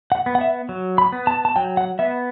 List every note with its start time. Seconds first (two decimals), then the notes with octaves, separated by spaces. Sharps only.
0.12 F#5
0.26 B3
0.35 F#5
0.41 E5
0.69 F#3
0.98 B5
1.12 B3
1.27 A5
1.45 A5
1.56 F#3 G5
1.77 F#5
1.99 B3 E5